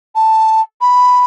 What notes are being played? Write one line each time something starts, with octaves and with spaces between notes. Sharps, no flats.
A5
B5